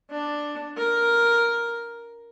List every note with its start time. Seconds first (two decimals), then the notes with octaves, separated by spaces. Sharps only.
0.10 D4
0.77 A#4